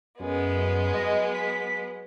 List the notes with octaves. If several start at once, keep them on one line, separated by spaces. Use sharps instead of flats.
F#2 F#3 G#3 B3
D#5
B6